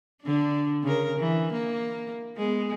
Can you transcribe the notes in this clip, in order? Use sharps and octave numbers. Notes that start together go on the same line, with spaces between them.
D3 D4
C#3 A#4
E3
A#3
G#3 B3